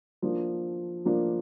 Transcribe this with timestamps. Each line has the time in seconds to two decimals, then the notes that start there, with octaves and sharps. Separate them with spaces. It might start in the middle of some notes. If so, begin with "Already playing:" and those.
0.22 F3 A#3 D4 F4
1.05 F3 A#3 D4 F4